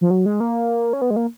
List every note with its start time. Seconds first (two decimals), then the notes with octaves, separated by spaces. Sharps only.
0.01 F3
0.10 F#3
0.26 G#3
0.40 A#3
0.93 C#4
1.02 B3
1.10 G#3
1.16 A#3